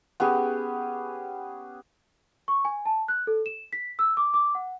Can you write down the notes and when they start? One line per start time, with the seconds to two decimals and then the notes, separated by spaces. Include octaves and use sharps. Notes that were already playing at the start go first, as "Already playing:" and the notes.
0.20 B3 C#4 G4 G#4
2.48 C#6
2.65 G#5
2.86 A5
3.08 F#6
3.27 A4
3.46 E7
3.73 B6
3.99 E6
4.17 D6
4.34 D6
4.55 F#5